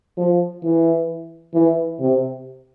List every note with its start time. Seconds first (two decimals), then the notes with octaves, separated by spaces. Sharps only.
0.17 F3
0.63 E3
1.54 E3
2.00 C3